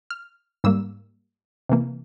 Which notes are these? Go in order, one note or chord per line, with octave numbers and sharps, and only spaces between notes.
F6
G#2 G3 A#3 E6
C3 E3 A#3